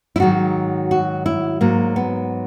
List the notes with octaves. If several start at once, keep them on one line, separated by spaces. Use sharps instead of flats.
E4
G#2 D#3 F#3 F#4
F#4
E4
G#2 F#3 A#3
B3